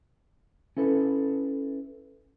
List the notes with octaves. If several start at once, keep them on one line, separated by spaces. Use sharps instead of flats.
C#4 E4 A4 B4